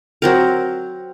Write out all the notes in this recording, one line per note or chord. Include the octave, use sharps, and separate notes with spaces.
F#3 C4 A#4